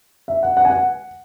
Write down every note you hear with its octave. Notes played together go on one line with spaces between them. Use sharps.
E5
F#5
F#5
G#5
F#5